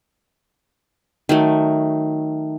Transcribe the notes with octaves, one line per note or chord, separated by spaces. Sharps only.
D#3 F#3 A3